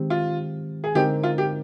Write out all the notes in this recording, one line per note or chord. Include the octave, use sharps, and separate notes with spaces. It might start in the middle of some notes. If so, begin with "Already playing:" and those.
Already playing: D#3 G#3 C4 G4
F4
G#4
D3 G#3 C4 D#4 G4 A#4
F4
G4